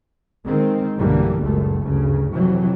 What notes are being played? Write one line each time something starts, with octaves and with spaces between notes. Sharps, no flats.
D#3 G#3 C4
B1 G2 D3 E3 G3 A#3
F#1 C#2 F#2 A#2 A3
D2 G2 C#3
F2 C3 E3 F#3